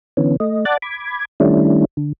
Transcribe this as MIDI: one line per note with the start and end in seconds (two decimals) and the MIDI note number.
0.17 0.37 50
0.17 0.37 52
0.17 0.37 59
0.17 0.37 61
0.40 0.65 57
0.40 0.65 75
0.65 0.77 74
0.65 0.77 78
0.65 0.77 81
0.65 0.77 86
0.65 0.77 90
0.65 0.77 93
0.82 1.25 83
0.82 1.25 86
0.82 1.25 92
1.40 1.85 51
1.40 1.85 55
1.40 1.85 57
1.40 1.85 61
1.40 1.85 62
1.40 1.85 64
1.97 2.13 50